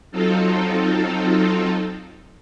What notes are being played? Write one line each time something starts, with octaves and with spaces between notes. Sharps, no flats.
F#3 C4 D#4 F4 A4